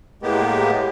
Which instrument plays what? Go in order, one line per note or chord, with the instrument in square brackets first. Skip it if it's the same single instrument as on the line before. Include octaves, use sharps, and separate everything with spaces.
[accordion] A2 G#3 A#3 B3 G4